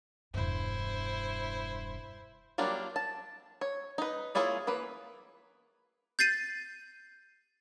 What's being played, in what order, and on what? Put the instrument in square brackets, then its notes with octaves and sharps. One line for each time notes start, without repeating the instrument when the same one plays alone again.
[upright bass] E1 G2 [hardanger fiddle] E4 C5
[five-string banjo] F#3 G3 A#3 D4 F4
A5
C#5
D#4 B4
A#3 E4 F4 G#4 C#5
E3 A#3 B4
[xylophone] G6 A6 C7 D#7